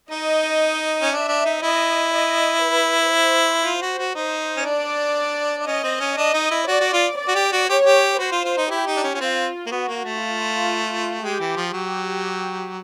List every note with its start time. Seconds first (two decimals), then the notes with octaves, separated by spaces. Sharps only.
0.11 D#4 D#5
1.02 C#4
1.12 D4 E5
1.29 D4
1.45 D#4
1.62 E4 D#5
2.12 D#5
2.63 B4
3.13 C5
3.64 F4
3.82 F#4
3.98 F#4
4.15 D#4 C5
4.57 C#4
4.65 D4 D5
5.66 C#4 D#5
5.84 C4
6.00 C#4
6.17 D4 D#5
6.34 D#4
6.51 E4
6.68 F#4 D5
6.80 F#4
6.93 F4
7.18 D5
7.28 F#4
7.35 G4
7.52 F#4
7.69 G4 C#5
7.85 G4
8.19 F#4 C5
8.32 F4
8.45 F4
8.58 D#4
8.70 E4 G4
8.87 D#4
8.96 D4
9.04 C#4
9.15 C#4
9.21 C4 F4
9.67 A#3
9.71 B3 F#4
9.88 A#3
10.05 A3
10.21 F4
11.23 G#3 G4
11.40 E3
11.57 F3
11.73 F#3 G4